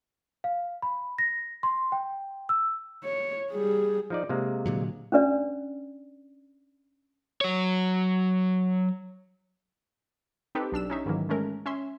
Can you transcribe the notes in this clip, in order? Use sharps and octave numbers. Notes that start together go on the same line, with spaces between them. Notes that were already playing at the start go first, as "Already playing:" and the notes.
F5
B5
A#6
C6
G5
E6
C#5
G3 G#4
F3 D#4 D5
C3 G#3 A#3
A#2 D3 F#3
C#4 D4 B4 D5
F#3 C#5
C4 D#4 G4 A4 B4
B1 D4 E6 E7
C#4 D#4 E5
G#2 D#3 E3 F#3 A#3
G#3 A3 C#4 A#4
C#4 E5 C6